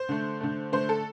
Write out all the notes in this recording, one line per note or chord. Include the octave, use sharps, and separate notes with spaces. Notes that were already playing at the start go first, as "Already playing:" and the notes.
Already playing: C5
D3 A3
D3 A3
D3 A3 C5
A4